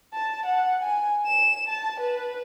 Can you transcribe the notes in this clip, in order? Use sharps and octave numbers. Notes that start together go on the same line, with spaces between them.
A5
F#5
G#5
E7
A5
B4